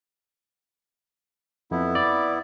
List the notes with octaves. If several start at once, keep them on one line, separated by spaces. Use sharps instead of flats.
F2 B3 E4
D5